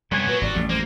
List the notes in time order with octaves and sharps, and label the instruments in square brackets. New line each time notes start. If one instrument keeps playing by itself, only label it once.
[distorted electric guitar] F#2 C3 [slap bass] G3 [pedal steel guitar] B3 C#5 G#5
[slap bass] A#2 [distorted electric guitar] F#3 [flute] B4
[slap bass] G#1 A#2 [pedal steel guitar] F3 G3 [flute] D5
[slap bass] A1 F2
[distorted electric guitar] A#3 [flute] C5